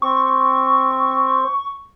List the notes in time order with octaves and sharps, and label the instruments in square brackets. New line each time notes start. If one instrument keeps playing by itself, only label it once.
[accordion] C4 [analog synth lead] C#6